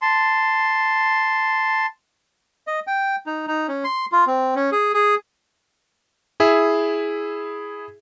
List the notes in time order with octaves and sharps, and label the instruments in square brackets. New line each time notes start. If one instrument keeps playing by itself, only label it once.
[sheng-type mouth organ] A5 C6
[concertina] D#5
G5
D#4
D#4
C#4
C6
F4
C4
C#4
G#4
G#4
[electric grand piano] E4 G#4 E5